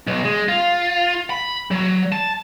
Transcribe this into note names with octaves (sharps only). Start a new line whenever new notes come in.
B1
G#3
F4
B5
F#3
A5